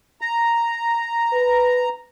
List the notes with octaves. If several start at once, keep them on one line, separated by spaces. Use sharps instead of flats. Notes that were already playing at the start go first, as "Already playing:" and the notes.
A#5
B4